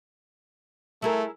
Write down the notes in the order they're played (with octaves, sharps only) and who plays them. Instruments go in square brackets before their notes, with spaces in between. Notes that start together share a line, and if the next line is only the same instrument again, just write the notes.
[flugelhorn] A3 [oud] E4 G#4 A#4